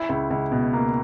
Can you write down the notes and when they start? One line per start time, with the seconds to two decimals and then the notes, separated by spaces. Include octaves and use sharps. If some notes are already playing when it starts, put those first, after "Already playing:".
Already playing: E4
0.09 C#2
0.30 C#2
0.52 B2
0.73 A#3